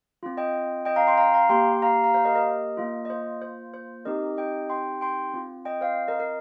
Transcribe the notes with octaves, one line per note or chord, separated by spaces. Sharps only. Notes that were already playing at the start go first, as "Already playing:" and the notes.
C4 F4
D#5 G5
D#5 G5
F5 A#5
G5 C6
F5 A#5
F5 A#5
A#3 G4 G5 C6
F5 A#5
F5 A#5
C5 F5
A#4 D#5
A#4 D#5
A#3 F4
D#5
C5
C5
C5
C4 D#4 G4 A#4 D#5
D#5 G5
G5 C6
G5 C6
C4 F4
D#5 G5
C5 F5
A#4 D#5
A#4